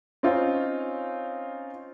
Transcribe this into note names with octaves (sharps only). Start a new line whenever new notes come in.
C4 C#4 D#4 F4